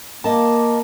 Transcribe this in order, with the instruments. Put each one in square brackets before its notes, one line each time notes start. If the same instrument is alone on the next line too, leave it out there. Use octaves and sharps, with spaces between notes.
[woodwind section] A#3 [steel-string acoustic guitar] D#5 A5